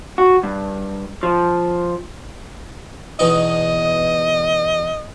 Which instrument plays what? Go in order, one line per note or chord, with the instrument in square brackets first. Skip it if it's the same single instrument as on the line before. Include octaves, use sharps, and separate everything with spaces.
[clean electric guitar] F#4
G2
F3
[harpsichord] E2 B2 D#4 [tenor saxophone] D#5